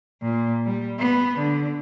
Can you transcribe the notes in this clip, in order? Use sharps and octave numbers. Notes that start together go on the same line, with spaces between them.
A#2
G3
B3
D3